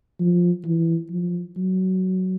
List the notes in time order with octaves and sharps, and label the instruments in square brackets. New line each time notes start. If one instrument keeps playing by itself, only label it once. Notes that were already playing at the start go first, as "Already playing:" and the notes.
[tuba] F3
E3
F3
F#3